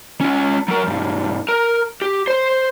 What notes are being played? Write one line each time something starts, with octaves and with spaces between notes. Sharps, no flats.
C#4 F4
F#3 A#4
B1 G2
A#4
G4
C5 C6